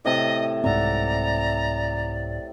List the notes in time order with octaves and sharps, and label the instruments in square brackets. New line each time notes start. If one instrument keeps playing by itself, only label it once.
[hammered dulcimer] A2 C3 A5 [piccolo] D#5
[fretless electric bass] C2 G#2 C4 [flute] D5 [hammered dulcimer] E5 F#5 [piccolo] A#5